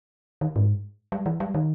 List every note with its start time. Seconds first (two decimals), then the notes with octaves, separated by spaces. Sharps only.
0.41 D#3
0.56 G#2
1.12 G3
1.26 E3
1.40 G3
1.54 D#3